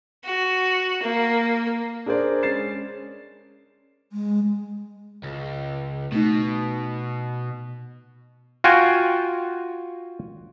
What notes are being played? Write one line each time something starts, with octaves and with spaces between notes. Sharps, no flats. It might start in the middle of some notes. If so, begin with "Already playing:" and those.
F#4
A#3
D4 G#4 A#4 C5 D5
G#3 C#4 A6 C7 E7
G#3
C#2
B2 A3 D#4
F4 F#4 G5 G#5